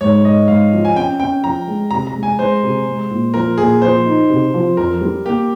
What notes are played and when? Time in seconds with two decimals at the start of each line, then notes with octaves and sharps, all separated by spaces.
0.01 G#2 C#5
0.24 G#2 D#5
0.48 G#2 F5
0.72 F3
0.85 G#5
0.96 C#4 G5
1.19 C#4 G5
1.43 F3 A#5
1.67 G#3
1.91 C3 A#5
2.07 A#5
2.15 G#3
2.23 G#5
2.39 G#3 C5
2.63 C3
2.86 G#3
3.10 A#2
3.34 F3 A#4
3.58 A#2 G#4
3.82 F3 C5
4.06 D#4
4.29 C3
4.54 F3
4.77 F2 A#4
5.01 G3
5.25 A#3 G4